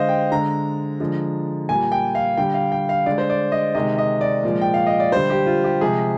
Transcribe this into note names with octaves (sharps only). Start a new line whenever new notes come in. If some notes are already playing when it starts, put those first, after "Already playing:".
Already playing: D3 G#3 C5 D#5 F5
G5
D3 G#3 A#5
D3 F3 G#3
A#2 G3 G#5
G5
F5
D3 G3 G5
F5
G5
F5
D3 G#3 D5
C5
D5
D#5
C3 D#3 G#3 D#5
D#5
D5
A#2 F3 G#3
G5
F5
D#5
D5
D3 G3 C5
G4
F4
G4
C3 F3 G#3 G#4